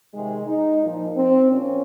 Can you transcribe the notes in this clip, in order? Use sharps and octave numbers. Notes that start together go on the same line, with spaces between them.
C3 D#3 G#3
D#4
A#2 F3
C4
A#2 F3 C#4